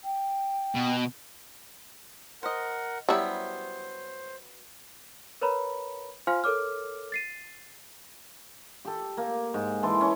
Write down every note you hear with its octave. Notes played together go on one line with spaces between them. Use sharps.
G5
B2
A#4 C5 D#5 F#5
F#3 G3 B3 C#4 E4 C5
A#4 B4 C#5 A#5 B5
F4 C5 F5 G#5 C6 F6
A4 A#4 C#5 D6 F6
A6 C7 D#7
G4 A4
A#3
G#2
E3 A4 C6 D6
C#4